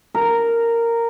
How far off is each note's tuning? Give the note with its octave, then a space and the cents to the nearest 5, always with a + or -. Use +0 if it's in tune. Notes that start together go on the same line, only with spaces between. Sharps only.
A#4 -10